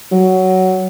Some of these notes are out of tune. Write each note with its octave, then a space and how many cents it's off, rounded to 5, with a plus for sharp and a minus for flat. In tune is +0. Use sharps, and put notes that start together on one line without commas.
F#3 +10